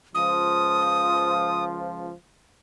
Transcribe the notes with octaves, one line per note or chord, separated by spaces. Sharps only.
C#2 F3 D#6